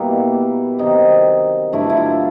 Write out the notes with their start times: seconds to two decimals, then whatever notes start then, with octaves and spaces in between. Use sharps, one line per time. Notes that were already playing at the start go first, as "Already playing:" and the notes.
Already playing: B2 G3 A#3 E4
0.78 C3 D#3 F#3 D#4
1.72 G2 D3 F#3 A3 E4
1.90 E4
1.97 F4